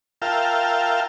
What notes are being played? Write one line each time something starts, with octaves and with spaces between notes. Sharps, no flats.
F4 A#4 E5 F5 G5 A5